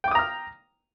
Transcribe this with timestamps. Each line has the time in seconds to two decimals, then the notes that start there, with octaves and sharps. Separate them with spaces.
0.04 G5
0.08 D6
0.11 D#6
0.15 A#5
0.19 F6